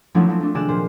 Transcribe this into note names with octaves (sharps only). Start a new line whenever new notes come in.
F3 F#3 A3 C#4 D4 E4
F3 A3 C4
A3 D4
C3 D#3 G#4 D5 F#6 E7
A#2 C5